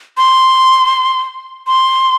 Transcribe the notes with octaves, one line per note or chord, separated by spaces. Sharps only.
C6
C6